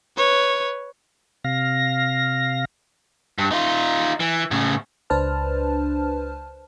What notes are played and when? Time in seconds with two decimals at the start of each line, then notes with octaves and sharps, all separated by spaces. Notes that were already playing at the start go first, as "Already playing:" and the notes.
0.17 B4 C#5
1.44 C3 F5 A#6
3.38 G2
3.51 D#4 F4
4.20 E3
4.51 A2 C#3
5.10 C#2 D4 B4 C5 A5 F6